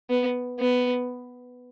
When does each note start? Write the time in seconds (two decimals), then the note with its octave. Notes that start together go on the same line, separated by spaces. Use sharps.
0.10 B3
0.59 B3